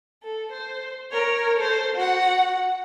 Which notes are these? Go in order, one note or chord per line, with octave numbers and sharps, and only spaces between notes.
A4
C5
A#4 C#5
A4 C5
F#4 F#5